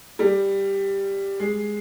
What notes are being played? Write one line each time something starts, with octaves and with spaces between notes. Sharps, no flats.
G3
G#3